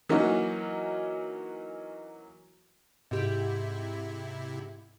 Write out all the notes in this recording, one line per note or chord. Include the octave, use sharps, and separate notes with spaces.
E3 F#3 A#3 C#4 D#4 F#4
G#2 C3 E4 G4